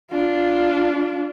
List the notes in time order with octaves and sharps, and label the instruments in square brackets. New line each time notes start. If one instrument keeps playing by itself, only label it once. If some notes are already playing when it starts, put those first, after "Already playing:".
[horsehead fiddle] D4 F4